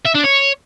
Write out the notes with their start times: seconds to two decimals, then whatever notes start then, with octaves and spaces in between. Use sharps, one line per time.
0.05 E5
0.14 D4
0.24 C#5